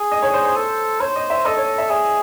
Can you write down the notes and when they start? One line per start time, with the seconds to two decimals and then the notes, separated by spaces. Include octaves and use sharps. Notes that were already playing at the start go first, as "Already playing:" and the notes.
Already playing: G#4
0.11 D#5
0.22 C#5
0.34 C5
0.45 C5
0.56 A4
1.00 C5 C#5
1.16 D#5
1.30 E5
1.46 A4 D#5
1.57 C#5
1.78 E5
1.90 G#4 E5